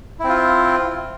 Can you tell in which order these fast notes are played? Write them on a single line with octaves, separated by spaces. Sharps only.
E4 C4 F4